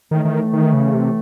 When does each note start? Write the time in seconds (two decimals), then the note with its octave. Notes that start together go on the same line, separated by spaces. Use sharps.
0.11 A2 D#3 E3 A3
0.25 D#3
0.53 D#3
0.73 C#3
0.94 C3